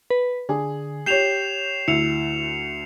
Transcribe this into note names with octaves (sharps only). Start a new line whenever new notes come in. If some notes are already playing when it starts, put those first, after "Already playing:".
B4
D3 G#4
G4 C#5 G6 C7 E7 F7
D2 E4 C#7 F7